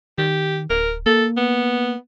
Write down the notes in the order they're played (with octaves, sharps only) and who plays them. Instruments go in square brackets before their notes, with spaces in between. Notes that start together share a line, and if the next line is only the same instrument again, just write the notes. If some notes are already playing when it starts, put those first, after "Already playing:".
[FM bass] D#3 [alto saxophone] G4
[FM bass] D1 [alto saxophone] A#4
[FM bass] A#3 [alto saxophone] A4
[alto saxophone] B3